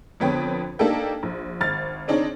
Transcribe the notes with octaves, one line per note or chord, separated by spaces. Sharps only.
F2 D3 B3 C#5 G5
A#3 D4 D#4 G4 A4 G5
A#1
G#1 F6 A6
C4 D4 D#4 G#4 C#5